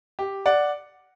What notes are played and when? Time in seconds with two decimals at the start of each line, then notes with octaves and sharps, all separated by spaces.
0.19 G4
0.46 D5 F#5